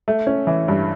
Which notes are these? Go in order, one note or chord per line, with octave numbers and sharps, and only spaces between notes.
A3
C#4
E3
G2